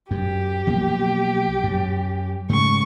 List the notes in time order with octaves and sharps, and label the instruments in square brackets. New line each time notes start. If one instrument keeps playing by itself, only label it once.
[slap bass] F#2 [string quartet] G4
[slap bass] B1 F3 A#3
F#2
[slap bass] G#2 C#3 A3 [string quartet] C#6